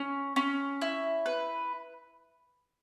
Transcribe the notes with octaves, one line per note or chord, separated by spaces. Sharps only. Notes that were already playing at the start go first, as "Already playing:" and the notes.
Already playing: C#4
C#4
E4
B4